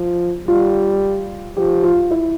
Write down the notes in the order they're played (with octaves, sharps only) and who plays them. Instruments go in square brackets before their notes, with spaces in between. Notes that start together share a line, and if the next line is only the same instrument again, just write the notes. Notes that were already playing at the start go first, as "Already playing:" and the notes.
Already playing: [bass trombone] F3
[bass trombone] G3 [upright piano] F4
[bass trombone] F3 [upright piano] G4
[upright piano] F4
E4